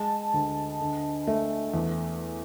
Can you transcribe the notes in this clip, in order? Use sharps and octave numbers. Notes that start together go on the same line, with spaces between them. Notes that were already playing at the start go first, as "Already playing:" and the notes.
Already playing: G#3 A5
D2
D3
A3
E2